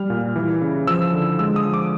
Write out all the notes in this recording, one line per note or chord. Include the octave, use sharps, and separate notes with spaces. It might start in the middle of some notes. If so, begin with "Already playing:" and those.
Already playing: G3 F6
A#2
E3
C#3
F3 E6
D3
G#3 E6
D#6
F3
D6